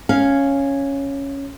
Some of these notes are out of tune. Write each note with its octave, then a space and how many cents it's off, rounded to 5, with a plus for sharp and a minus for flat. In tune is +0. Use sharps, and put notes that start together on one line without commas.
C#4 +0 F5 -5